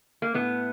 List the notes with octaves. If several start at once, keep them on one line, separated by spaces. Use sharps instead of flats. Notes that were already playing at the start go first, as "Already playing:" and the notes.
A#3
A2 B3